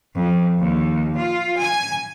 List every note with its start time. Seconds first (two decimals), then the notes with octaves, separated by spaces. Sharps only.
0.15 F2
0.59 D#2
1.18 F4
1.57 G#5